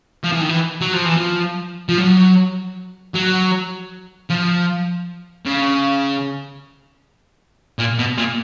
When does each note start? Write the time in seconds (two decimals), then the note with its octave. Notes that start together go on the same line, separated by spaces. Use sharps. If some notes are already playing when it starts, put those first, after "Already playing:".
0.24 F3
0.32 E3
0.41 D#3
0.49 E3
0.81 F#3
0.94 F3
1.06 E3
1.18 F3
1.89 F3
1.98 F#3
3.14 F#3
4.30 F3
5.46 C#3
7.79 A#2
7.99 B2
8.17 A#2